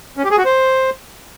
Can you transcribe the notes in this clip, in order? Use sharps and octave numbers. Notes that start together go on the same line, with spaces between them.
C#4
G4
G#4
F#4
C5